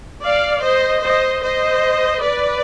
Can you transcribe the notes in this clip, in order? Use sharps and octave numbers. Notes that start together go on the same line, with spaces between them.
D5 F5
C5 D#5
C5 D#5
C5 D#5
B4 D5